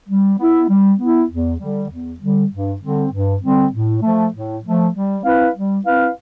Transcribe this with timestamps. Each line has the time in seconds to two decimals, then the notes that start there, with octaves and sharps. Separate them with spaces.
0.09 G3
0.38 B3 E4
0.69 G3
0.99 B3 E4
1.30 E2
1.60 D3 G3
1.90 E2
2.20 D3 G3
2.51 G2
2.82 D3 G3 C4
3.12 G2
3.42 D3 G3 C4
3.72 A2
4.02 F3 A3
4.33 A2
4.64 F3 A3
4.94 G3
5.24 C4 E4 B4 F5
5.55 G3
5.85 C4 E4 B4 F5